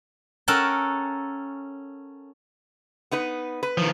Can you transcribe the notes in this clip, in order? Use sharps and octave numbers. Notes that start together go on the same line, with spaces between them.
C#4 A4 A#4 F#5 G5 A5
B3 D#4 B4
B4
D#3 F3